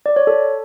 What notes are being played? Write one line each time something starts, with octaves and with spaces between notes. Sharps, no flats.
D5
C#5
A4